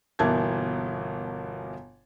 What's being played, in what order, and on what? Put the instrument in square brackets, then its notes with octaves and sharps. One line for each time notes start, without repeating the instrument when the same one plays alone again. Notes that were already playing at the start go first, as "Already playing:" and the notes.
[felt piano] G1 B2 E3 A#3 A5 G#6